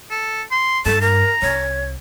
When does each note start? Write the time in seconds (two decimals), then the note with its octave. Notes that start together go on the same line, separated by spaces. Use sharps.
0.11 A4
0.51 C6
0.86 G2 A4 A5
1.01 A#4 A#5
1.42 C2 C#5